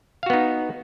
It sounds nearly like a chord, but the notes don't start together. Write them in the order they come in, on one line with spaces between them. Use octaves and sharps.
F5 F#4 B3 D#4